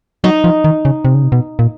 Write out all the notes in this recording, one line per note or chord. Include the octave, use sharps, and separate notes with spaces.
F#3 D#4
F3
D#3
C#3
C3
C#3
C3
B2
A#2